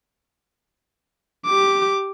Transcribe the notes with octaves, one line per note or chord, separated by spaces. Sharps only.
G4 D6